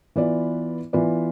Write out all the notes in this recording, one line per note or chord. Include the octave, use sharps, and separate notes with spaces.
E3 B3 F4 B4 D5
E3 B3 F4 B4 D5